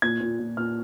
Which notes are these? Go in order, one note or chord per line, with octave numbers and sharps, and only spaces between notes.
A#2 G#6
A#2
A#2
A#2 F6